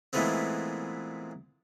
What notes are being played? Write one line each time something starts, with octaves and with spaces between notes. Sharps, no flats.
A#2 E3 G#3 A3 B3 C4